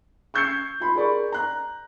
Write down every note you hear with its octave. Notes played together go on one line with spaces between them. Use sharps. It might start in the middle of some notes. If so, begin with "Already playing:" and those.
C#6 E6 G6 G#6 C7 C#7
F4 B5 C6
G#4 A#4 D5 B5 C#6
A#5 F#6